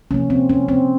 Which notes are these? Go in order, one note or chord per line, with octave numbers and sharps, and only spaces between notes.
C3 F3 A#3 C#4
C4
C#4
C4